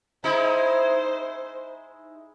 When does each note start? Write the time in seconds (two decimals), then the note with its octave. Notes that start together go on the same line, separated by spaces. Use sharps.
0.24 G#3 D#4 E4 C5